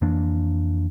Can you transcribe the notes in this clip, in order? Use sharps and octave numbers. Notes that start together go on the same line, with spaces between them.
F2 E3 A#3 D4